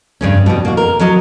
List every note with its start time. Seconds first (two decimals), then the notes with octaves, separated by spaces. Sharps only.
0.21 G2 C#3 C#4
0.46 B2 G3
0.65 A#3 F#4
0.77 A#4
1.00 F#3 A#4 D#5